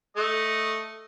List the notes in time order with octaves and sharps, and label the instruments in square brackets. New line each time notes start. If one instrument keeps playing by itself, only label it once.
[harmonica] A3 D#5